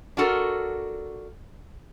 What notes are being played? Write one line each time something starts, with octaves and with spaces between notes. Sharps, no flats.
D4 F4 F#4 A4 A#4